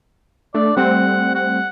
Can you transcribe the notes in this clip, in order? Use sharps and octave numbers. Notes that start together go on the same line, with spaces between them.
A3 D4 D5
G3 A3 C4 F#5
F#5